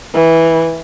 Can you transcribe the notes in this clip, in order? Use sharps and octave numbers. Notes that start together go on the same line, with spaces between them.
E3